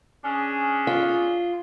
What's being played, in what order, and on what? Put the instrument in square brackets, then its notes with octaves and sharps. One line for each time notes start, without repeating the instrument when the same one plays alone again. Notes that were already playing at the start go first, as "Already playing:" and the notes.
[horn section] C#4 D4 G#4
[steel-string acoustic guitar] F4